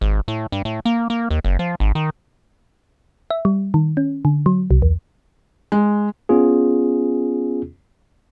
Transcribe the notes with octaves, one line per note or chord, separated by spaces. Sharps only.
G#1
A2
G2
A2
A#3
A#3
D#2
F#1
F3
G#1
D#3
E5
G3
D#3
C#4
D3
F#3
C2
E2
G#3
B3 C#4 F4 G#4